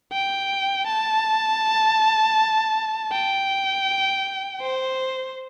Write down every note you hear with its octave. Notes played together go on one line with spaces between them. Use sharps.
G5
A5
G5
C5